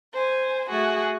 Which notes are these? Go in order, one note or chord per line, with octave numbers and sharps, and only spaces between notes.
C5 G#5
A3 F#4 G#4